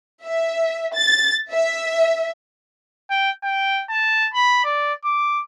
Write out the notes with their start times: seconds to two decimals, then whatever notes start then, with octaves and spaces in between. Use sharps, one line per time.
0.24 E5
0.94 A6
1.51 E5
3.10 G5
3.43 G5
3.90 A5
4.34 B5
4.64 D5
5.05 D6